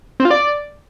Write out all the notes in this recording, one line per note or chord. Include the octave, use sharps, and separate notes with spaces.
C4
F4
D5